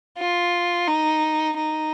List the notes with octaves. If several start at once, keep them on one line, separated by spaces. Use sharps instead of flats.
F4
D#4
D#4